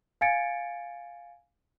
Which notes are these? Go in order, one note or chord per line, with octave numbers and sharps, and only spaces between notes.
F5 G#5 G#6 A6 C#7 D7